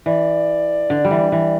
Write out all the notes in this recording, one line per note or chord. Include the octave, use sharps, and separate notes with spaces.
E3 D5
D3
G3
E3
E3